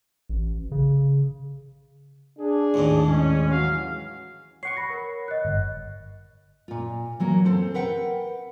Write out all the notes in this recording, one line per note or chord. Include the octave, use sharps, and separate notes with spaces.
A1
C#3
D4 G#4
A1 D#2 G#2
G#3 C#4
E3 F#3 F5
C#5 F#5 C#6 C7 C#7
B5 A#6
A#4
D#5 F#6
G1
A#2 F4
E3 F#3 A#3
C4 A4 C5
A#4 B4 F#5 G5